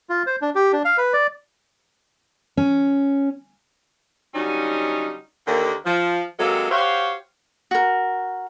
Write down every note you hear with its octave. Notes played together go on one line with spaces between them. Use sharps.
F4
C5
D4
G4
D4
F5
B4
D5
C#4
D3 F#3 G3 C#4 D#4
D#2 D3 A#3
F3
C3 F#3 G#3 A#3 C4 A4
F#4 G4 C5 C#5 F5
F#4 A#4